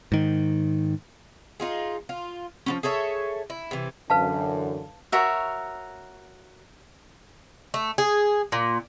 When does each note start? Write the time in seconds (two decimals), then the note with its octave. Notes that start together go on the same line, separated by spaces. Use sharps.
0.12 G#2 D#3
1.60 D#4 F4 G#4
2.09 F4
2.66 F3 B3 C#4
2.83 G#4 A4 C#5 E5
3.50 E4
3.71 C3 E3
4.10 F#2 D3 E3 B4 F5 A5
5.12 F#4 A#4 C#5 E5
7.74 A3
7.98 G#4
8.52 A#2